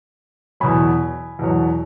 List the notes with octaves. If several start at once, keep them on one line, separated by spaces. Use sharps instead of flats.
E2 B2 F#3 G#5 B5
E2 B2 F#3